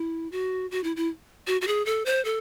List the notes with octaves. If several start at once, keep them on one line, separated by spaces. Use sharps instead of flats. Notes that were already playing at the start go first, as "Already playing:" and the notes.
Already playing: E4
F#4
F#4
E4
E4
F#4
F#4
G#4
A4
C5
A4